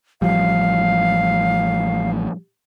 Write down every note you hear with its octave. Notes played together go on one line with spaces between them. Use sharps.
A1 F3 G3 F5